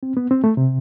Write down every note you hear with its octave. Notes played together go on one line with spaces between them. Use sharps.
C4
B3
C4
A3
C3